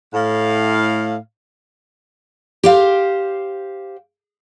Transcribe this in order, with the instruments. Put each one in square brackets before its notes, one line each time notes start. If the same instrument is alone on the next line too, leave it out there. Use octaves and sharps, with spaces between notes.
[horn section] A2 F5
[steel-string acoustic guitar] G4 C5 F5